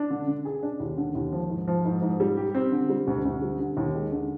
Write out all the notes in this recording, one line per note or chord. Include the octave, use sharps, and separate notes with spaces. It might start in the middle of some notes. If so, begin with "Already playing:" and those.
Already playing: D4
D3
D3
G#4
D4
D#2
D3
D#2
F3
G#2
F3
G#2
G#2
G3
G4
C4
D3
G3
D2
D2
G3
D3
D#2
G#3
D3